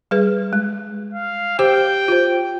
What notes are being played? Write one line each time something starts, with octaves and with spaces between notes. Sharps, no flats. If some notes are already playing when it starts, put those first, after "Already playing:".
G3 G#4 B4
G#3
F5
G4 C5 G5 D6
F4 C5